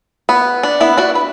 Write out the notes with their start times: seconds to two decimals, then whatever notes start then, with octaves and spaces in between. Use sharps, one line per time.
0.29 B3
0.63 D4
0.81 B3 E4
0.97 D4 F#4
1.15 B4